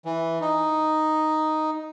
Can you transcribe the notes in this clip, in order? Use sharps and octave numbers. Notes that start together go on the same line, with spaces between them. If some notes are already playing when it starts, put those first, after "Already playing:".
E3
D#4